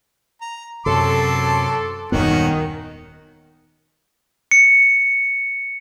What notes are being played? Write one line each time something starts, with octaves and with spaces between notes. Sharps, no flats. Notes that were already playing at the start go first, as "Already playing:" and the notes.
A#5
F#2 C3 F#3 A4 C6 D6
D#1 F#2 D#3 B3 C#4 F#4 F#5
C#7